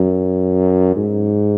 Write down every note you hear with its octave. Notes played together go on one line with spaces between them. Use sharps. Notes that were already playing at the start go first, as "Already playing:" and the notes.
Already playing: F#2
G#2